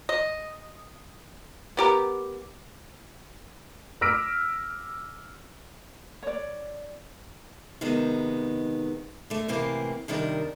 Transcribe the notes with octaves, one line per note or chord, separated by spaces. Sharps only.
D#5
B3 G4 A#4
D6 E6 F6 A#6 B6 D7
C#5 D5
G#2 C3 D#3 G#3 B3
D3 A3
A2 C3 E3 A#3 C4
C3 D#3 G3 D4 A#4